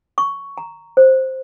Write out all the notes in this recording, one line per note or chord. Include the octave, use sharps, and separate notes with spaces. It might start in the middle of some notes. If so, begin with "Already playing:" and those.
C#6
A#5
C5